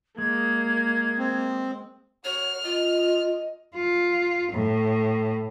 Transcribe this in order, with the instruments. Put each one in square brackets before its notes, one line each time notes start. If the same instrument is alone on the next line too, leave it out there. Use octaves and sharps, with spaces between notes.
[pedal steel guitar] G#3 [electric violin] A#3 [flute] G#6
[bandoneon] C4
[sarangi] F#4 [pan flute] C#5 [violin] F6
[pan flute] F4 [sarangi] D#5
[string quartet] F4
A2